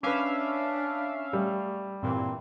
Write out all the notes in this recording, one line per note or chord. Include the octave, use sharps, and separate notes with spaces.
C#4 D4 B4 E5 F5 D6
G3 A3
G2 A#2 E3 C4